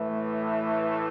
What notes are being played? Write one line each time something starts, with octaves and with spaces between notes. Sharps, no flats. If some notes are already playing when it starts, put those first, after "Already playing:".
Already playing: A2 E3 A3